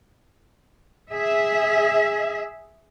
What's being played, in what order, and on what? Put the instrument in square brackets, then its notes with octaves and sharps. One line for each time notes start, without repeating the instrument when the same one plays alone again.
[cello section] G#4 E5